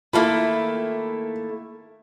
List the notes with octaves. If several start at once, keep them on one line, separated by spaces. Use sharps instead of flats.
D#3 A3 A#3 E4 F4 E5 B5